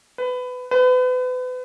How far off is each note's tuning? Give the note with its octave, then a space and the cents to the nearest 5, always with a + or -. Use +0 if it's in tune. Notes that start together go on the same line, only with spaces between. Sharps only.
B4 +20
B4 +35